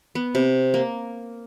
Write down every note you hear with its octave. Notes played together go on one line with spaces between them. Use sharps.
B3
C3
A#3